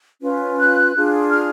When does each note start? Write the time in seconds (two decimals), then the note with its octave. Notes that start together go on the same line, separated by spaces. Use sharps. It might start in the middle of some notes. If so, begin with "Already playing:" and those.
0.21 C#4 F4 B4
0.59 F#6
0.95 D4 F4 G#4
1.31 F6